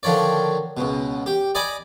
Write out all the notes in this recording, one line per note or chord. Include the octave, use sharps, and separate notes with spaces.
D3 D#3 F3 C#5 D5
C#2 B2
G4
D5 D#5 G#5 B5 D6